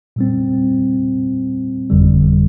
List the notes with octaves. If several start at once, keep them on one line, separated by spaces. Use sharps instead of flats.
A#2 G3 C4
G1 F2 D3 G3